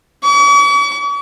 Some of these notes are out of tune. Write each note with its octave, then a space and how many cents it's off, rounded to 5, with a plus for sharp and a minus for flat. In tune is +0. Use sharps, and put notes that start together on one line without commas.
C#6 +45